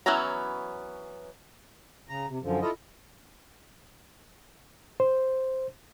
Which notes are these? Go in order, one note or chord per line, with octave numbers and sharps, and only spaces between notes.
E3 F#3 B3 C#4 A#5
C#3 A#5
C3
F#2 D3 F3
E4 F4 A4 D#5
C5